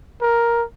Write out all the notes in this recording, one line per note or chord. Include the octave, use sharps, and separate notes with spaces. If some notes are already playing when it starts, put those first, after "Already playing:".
A#4